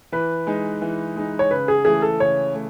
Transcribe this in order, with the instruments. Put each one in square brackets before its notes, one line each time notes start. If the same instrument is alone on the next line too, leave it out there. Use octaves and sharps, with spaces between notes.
[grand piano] E3 [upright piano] B4
[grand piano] G#3 D#4
E3
G#3 D#4
[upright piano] C#5
[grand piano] C#3 [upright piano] B4
[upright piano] G#4
[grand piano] E3 A3 [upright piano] G#4
[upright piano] A4
[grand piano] C#3 [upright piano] C#5
[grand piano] A3